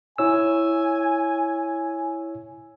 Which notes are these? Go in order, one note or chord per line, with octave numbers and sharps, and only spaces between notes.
E4 C#5 G#5 E6